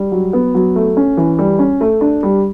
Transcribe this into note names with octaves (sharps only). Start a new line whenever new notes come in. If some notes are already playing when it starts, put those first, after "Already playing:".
Already playing: G3
F#3
B3
F#3
A3
C#4
E3
G3
C#4
A3
D4
G3